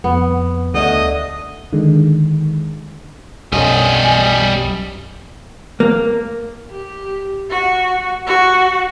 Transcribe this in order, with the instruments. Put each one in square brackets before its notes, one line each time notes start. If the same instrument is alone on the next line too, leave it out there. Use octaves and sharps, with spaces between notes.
[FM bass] F2 [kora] B3
[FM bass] D2 [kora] D3 A3 D4 [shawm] D#5
[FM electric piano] D3 D#3 G#3
[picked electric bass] B1 F#2 [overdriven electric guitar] G3 D#5 [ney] G#5
[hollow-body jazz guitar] A#3
[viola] G4
F#4
F#4